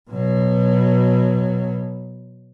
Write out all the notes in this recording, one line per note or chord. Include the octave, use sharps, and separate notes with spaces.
B2 F#3